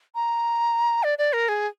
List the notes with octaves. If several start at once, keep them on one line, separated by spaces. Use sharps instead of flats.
A#5
D5
D5
A#4
G#4